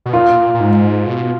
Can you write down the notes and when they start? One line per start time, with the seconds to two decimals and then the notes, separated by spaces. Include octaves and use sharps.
0.06 B2
0.13 A#2 F4
0.54 A#2
0.60 G#2
1.06 B2